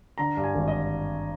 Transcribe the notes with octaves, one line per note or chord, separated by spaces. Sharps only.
D3 A#5
G2
G#5
G#1
D#5